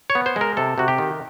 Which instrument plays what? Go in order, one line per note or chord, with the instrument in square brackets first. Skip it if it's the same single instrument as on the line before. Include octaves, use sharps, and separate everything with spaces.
[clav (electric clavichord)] C#5
B3
C5
G#3
A#4
C3 A4
C3 F#4
G4
D#3